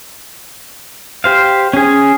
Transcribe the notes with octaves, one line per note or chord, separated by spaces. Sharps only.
G4 C5 F5
C#4 G#4